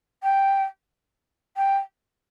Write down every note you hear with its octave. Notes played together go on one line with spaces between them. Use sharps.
G5
G5